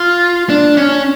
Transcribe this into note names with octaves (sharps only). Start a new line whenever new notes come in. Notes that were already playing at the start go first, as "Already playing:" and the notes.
Already playing: F4
D4
C#4